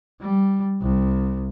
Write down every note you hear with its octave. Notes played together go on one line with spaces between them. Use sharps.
G3
C2